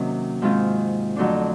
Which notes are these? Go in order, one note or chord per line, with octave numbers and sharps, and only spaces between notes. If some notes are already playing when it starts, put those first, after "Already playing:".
Already playing: C3 D#3 F#3 A#3 C#4
G#2 D#3 G#3 C4 F4
F2 D3 F#3 A3 D4